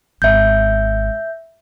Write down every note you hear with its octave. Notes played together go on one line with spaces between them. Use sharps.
G#1 E5 G6